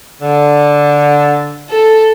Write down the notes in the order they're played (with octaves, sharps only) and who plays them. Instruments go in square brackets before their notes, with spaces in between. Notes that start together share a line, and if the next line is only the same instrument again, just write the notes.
[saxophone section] D3
[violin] A4